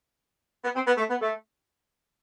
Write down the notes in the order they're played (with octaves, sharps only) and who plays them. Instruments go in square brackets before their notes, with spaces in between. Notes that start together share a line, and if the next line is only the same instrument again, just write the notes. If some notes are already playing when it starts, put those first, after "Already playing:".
[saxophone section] B3
C4
B3
A3
B3
A3